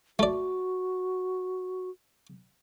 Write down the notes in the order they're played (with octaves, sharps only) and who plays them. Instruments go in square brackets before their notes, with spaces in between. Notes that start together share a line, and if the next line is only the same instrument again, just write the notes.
[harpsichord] A3 D5 [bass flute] F#4